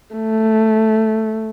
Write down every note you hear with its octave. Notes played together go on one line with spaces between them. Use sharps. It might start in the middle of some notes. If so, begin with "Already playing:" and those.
A3